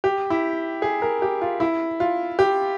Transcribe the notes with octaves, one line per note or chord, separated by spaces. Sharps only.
G4
E4
G#4
A#4
G4
F4
E4
F4
G4